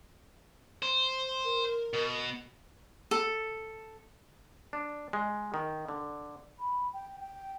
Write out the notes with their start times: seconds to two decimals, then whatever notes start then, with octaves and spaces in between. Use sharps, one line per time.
0.83 C5
1.45 A#4
1.93 B2
3.11 A4
4.73 D4
5.13 G#3
5.54 D#3
5.88 D3
6.59 B5
6.93 G5
7.20 G5